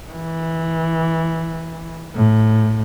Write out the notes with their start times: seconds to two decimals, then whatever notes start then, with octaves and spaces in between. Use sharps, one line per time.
0.11 E3
2.15 A2